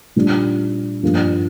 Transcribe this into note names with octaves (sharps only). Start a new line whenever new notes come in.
A#2 G3 D4
G2 F3 A#3